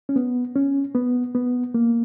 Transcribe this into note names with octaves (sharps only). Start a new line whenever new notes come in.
C#4
B3
C#4
B3
B3
A#3